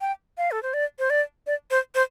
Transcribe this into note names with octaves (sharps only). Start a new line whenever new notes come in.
G5
F5
A4
C5
D5
C5
D5
D5
C5
C5